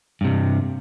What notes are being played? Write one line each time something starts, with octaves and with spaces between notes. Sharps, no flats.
G2 C3